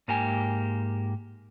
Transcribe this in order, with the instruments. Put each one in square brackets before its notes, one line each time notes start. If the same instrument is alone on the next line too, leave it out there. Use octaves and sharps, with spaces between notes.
[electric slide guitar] G#2 A#3 G4 G#5